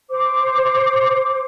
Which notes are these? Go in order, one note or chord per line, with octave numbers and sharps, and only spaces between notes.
C5 D6